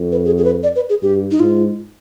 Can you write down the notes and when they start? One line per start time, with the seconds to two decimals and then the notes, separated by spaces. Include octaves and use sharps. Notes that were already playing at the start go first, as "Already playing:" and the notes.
Already playing: F2
0.12 B4
0.25 G#4
0.38 G#4
0.44 B4
0.63 D5
0.76 B4
0.90 G#4
1.02 G2 G4
1.31 D#4
1.40 G#2 F4